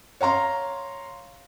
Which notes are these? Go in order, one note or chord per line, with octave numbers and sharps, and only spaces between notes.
C#5 F5 A#5 C6